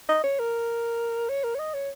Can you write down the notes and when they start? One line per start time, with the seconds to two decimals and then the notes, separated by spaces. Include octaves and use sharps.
0.09 D#5
0.24 C#5
0.39 A#4
1.29 C#5
1.44 A#4
1.55 C#5
1.59 D#5
1.74 C#5